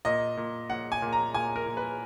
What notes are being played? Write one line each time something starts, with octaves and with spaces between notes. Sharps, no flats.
A#2 D#5
A#2
A#2 F#5
G#5
A#2
A#5
A#2 G#5
A#4
A#2
B4